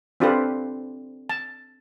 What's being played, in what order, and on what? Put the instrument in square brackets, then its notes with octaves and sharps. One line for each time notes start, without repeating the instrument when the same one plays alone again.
[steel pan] C4 D4 F4 G4 A4 B4
A5